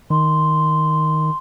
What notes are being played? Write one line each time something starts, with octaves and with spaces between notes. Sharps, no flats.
D#3 C6